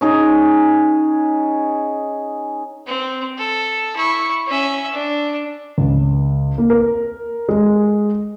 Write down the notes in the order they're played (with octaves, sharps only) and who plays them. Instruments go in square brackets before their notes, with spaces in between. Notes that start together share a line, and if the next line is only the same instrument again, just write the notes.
[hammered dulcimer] C#4 D#4 G#4
[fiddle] C4
A4
E4 C#6
C#4 E5
D4
[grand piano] C#2
A#3
A#4
G#3